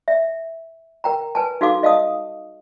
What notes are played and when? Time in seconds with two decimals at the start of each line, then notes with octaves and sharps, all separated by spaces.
0.08 E5
1.04 A#4 G5 A#5
1.35 B4 G#5 A5
1.61 D#4 F#4 A4 F5 D6
1.83 D#5 F5 A5 D#6